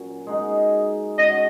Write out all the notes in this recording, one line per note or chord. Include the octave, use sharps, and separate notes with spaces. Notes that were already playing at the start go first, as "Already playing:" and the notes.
Already playing: A#2 F#3 C#4 F#4
G#3 D#4 F#4
G#3 C#4 F#4 D#5